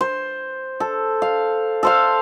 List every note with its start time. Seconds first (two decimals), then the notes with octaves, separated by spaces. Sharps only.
0.01 C5
0.80 A4
1.22 F5
1.83 A4 C5 F5